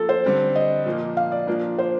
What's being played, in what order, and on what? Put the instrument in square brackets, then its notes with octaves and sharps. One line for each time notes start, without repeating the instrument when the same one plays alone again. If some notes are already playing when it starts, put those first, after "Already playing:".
Already playing: [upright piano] F3 A#3 F4 [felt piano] A4
[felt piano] C5
[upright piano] D3 G3 C4
[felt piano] D#5
[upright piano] A#2 F3 A#3
[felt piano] F5
D5
[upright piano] A#2 F3 A#3 D4
[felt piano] C5